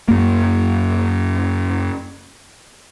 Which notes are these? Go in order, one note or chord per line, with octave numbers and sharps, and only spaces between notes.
F#2 A#3